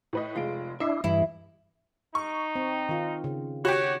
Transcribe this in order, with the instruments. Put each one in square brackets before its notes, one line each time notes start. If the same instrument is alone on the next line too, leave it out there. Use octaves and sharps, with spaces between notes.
[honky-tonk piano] A2 B4 D#5
[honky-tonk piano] F1 G#3 D7 [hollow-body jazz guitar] F4
[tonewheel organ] D4 E4 [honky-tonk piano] D#5 C7 [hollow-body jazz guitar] E5
[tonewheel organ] G2 [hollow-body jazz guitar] E3 [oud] E4
[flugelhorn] D#4 [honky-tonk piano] C#6
[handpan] C4
D#3 F4
C#3
[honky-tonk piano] F#4 G4 [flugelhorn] C#5